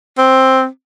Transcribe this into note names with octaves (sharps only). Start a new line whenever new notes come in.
C4